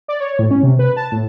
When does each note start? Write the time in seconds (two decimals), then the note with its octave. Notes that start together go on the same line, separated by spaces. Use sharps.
0.08 D5
0.20 C#5
0.39 A2
0.51 C#4
0.63 C3
0.79 B4
0.97 A5
1.12 A2